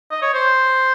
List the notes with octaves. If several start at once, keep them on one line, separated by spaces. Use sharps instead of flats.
D#5
C#5
C5